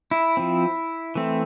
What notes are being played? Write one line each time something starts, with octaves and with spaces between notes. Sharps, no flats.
E4
F3 C4
E3 A3 C4